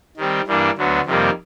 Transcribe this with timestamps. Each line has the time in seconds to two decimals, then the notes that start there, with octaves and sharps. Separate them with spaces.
0.17 D#3 G3 C4
0.47 G2 E3 G3 A#3 D4
0.76 D2 D3 F#3 B3
1.05 F2 C3 D#3 G3 A#3